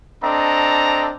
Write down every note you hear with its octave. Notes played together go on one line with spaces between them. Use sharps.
C4 D4 A4 D#5 A#5